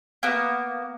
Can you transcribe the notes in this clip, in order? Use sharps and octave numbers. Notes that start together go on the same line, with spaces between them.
A#3 B3